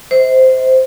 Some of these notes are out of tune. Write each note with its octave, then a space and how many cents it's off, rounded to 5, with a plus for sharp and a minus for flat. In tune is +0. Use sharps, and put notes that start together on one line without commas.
C5 -10 E5 -45